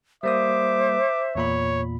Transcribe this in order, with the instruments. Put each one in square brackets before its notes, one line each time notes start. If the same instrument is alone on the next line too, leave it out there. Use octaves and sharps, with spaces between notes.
[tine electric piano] G3 A#3 D#6 [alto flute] C5 [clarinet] E5 [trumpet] D6
[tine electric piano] E2 A#2 B5 [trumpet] C#5